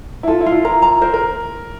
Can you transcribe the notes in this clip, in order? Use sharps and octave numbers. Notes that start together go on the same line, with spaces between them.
E4
F4 A4
E4
F4
E4
A#4 A#5
A#5
A#4 C5
A#4